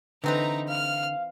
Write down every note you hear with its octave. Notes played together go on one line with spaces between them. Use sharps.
D3 E3 C4 D#4 B4 A#5
F5 F6